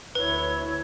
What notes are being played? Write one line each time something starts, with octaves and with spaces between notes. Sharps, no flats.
D2 E4 B4 C#5